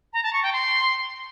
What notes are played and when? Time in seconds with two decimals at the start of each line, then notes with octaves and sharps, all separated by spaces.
0.13 A#5
0.23 A5
0.33 C#6
0.43 G5
0.53 C6